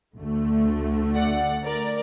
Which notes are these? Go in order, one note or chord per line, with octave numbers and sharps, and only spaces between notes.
D2 D3 A3
D5 F#5
A#4 D5